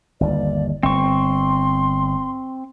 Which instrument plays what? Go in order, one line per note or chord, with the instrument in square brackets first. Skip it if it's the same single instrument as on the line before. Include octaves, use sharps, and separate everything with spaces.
[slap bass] G1 D#2 [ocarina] D5
[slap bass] G1 [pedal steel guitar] C4 C#6 [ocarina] C6